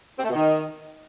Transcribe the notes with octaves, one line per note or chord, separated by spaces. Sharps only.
C4
A3
B2
D#3